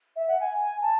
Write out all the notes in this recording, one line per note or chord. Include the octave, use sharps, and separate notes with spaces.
E5
F#5
G#5
A5